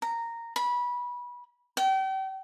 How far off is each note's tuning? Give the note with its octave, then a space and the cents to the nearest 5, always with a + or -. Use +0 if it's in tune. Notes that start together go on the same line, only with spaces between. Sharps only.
A#5 -10
B5 -20
G5 -35